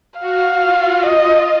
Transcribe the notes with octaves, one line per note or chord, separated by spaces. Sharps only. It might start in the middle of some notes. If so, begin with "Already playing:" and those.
F#4 F5
F4
F4 D#5